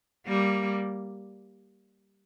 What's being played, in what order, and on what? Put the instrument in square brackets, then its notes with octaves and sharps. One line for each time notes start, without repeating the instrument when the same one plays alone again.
[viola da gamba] G3 A#3